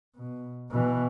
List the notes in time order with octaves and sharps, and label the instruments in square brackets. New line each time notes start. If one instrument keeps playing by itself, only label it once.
[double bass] B2
B2 E3